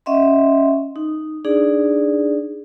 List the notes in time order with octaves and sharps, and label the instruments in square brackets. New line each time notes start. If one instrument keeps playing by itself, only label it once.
[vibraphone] C#4 D#5 E5 F#5 C6
D#4
D4 D#4 G#4 D5